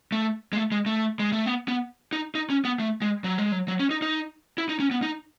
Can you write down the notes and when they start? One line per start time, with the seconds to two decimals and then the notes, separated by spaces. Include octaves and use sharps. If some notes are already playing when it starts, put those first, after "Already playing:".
0.12 A3
0.53 G#3
0.57 A3
0.72 G#3
0.86 A3
1.19 G#3
1.32 A3
1.46 B3
1.68 B3
2.13 D#4
2.35 D#4
2.50 C#4
2.65 B3
2.79 A3
3.02 G#3
3.24 F#3
3.38 G#3
3.52 F#3
3.68 F#3
3.80 C#4
3.91 D#4
4.02 D#4
4.58 E4
4.69 D#4
4.80 C#4
4.91 B3
5.02 D#4